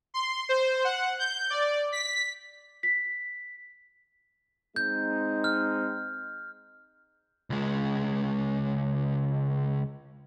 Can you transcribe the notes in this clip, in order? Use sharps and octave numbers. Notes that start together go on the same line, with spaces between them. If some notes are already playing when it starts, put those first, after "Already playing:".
C6
C5
F#5
G6
D5
B6
B6
G#3 C4 D#4 G6
F6
C#2 G#3